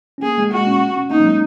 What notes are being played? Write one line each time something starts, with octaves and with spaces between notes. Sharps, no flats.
C#4
A#3 G#4
G#3
G#3 F#4
C#4
C#4
A#3 D#4
F#3
G#3